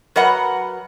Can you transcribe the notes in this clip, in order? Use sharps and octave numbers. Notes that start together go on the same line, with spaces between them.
F#3 A#4 B4 D#5 F#5